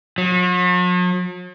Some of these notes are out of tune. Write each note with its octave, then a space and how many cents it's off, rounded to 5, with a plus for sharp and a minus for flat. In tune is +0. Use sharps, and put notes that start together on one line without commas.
F#3 -45